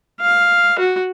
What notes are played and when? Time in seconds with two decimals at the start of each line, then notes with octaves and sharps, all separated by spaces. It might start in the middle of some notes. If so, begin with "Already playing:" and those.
0.21 F5
0.79 F#4